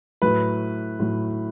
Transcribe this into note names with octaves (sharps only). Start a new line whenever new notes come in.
A2 F#3 B4
A2 F#3